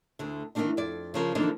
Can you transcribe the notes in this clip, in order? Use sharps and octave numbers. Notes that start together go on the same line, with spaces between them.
D2 D3
D#3 E3 G3 A#3 D4 D#4
F2 D5
C#3 F3 A#4
D3 E3 F3 A#3 D4 D#4